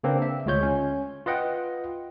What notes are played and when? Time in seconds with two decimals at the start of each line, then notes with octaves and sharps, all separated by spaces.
0.04 C#3 A#3 C4 D4 B4
0.22 E5
0.46 D2 G#3 F4 C#5 G6
0.63 C#4
1.26 F4 B4 D#5 F#5 G5